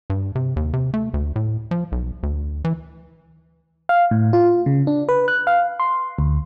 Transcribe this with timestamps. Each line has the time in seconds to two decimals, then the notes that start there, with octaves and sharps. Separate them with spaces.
0.10 G2
0.35 C3
0.56 D#2
0.73 C3
0.94 A3
1.14 D2
1.36 A2
1.71 F3
1.92 B1
2.23 D2
2.65 E3
3.89 F5
4.11 A2
4.33 F4
4.66 C#3
4.87 D4
5.09 B4
5.28 F#6
5.47 F5
5.80 C6
6.19 D2